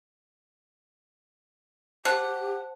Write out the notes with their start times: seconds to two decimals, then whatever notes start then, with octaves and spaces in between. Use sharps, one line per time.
2.05 G4 C5 F#5 A5